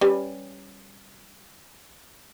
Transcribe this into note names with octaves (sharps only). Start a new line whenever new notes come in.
G3 C#4 B4